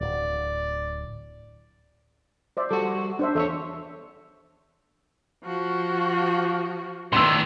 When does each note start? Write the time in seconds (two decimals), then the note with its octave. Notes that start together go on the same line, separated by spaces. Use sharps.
0.01 D1 D5
2.57 C5 D5 E5
2.71 G3 F#4 A4
3.19 D4 C5 E5
3.35 E2 F4 A4 C#5 E5
5.44 F3 F#4
7.13 A2 D#3 D5 C6 E6